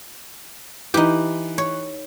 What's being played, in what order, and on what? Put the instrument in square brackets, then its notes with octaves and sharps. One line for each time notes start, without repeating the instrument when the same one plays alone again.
[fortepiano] E3 [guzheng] D#4 G4
[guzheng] C#5